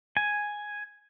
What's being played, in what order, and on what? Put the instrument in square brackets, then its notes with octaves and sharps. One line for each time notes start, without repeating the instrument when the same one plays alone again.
[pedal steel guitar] G#5